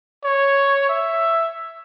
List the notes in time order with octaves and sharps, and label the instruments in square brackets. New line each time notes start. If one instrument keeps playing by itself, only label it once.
[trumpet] C#5
E5